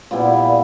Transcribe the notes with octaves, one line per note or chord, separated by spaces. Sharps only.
A#2 G3 B3 E4